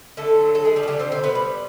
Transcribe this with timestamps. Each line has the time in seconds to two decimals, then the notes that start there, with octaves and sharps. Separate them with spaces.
0.17 D3 A3 A4
0.41 F#3
0.55 A4
0.65 G#3 A3 G#4
0.76 G3 G4
0.83 F#4
0.88 D3 G3 G4
0.99 C4 C5
1.12 B2 C4 C5
1.24 B3 B4
1.35 G3